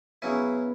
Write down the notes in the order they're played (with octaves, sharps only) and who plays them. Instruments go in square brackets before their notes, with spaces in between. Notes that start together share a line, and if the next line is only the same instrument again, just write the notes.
[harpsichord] C#3 F#3 C#4 E4 [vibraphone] B3 B4